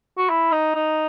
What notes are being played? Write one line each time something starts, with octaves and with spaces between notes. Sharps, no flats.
F#4
E4
D#4
D#4